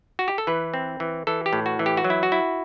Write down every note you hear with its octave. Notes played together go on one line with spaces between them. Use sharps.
F#4
G4
A4
E3 B4
C4
E3
E3 A4
G4
A2
F#4
E3
G4
F#4
F#3
E4
F#4
E4